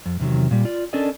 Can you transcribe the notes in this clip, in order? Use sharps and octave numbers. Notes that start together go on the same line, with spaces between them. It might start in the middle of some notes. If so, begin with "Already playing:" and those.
F2
E2 C3 D#3 F#3
A#2 G3
F4 D5
C#4 D4 A4 A#4 D5 D#5